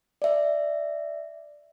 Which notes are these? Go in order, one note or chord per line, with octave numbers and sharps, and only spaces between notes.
D5 E5